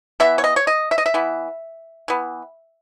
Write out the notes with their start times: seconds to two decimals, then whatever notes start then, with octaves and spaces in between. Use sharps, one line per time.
0.20 E3 B3 E5
0.38 C#5
0.44 D#5
0.56 C#5
0.67 D#5
0.91 E5
0.98 D#5
1.06 E5
1.14 E3 B3
2.08 E3 B3